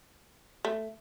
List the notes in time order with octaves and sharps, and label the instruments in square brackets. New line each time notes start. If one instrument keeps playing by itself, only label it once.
[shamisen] A3